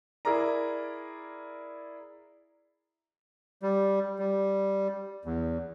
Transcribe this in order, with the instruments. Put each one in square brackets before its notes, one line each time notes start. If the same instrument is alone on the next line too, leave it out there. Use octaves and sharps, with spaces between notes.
[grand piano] E4 G#4 A#4 D5 A#5
[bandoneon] G3
G3
E2